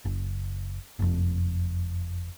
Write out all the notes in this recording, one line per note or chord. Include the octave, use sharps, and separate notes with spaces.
F#1
F#1 F2